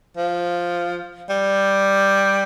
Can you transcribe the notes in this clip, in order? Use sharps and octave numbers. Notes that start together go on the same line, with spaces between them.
F3
G3